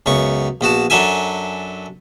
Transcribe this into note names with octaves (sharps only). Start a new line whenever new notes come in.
C#2 F#2 B3 C#6
A#1 B3 F#4 A5
F#2 F#3 D4 A4 E5 G#5